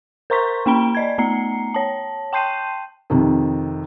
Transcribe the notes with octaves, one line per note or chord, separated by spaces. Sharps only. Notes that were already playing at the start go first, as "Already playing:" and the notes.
A#4 C5 A#5 C6 C#6 B6
A#3 C#4 G5 B5 D7 G7
D5 D#5 G#6
A3 B3 A#5 C7 C#7
C#5 A5
G5 A5 C6 G6 C7 D#7
F2 C3 D#3